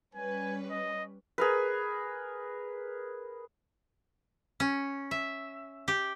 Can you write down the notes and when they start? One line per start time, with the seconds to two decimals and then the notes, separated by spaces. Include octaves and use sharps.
0.15 G3 C#4 B4 G#5
0.71 D#5
1.38 G#4 A#4 B4
4.60 C#4
5.11 E5
5.88 G4